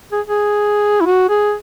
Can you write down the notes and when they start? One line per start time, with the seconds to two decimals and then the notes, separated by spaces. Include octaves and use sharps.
0.12 G#4
0.28 G#4
1.01 E4
1.06 F#4
1.29 G#4